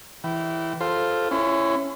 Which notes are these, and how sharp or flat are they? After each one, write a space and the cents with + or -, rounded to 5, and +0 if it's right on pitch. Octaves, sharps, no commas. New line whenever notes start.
E3 +0 G5 -25
F4 +0 A4 +0 C5 +0
C#4 +0 E4 +15 C6 -45